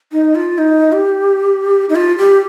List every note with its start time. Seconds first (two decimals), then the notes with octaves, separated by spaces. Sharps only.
0.12 D#4
0.35 F4
0.58 D#4
0.92 G4
1.89 D#4
1.96 F4
2.18 G4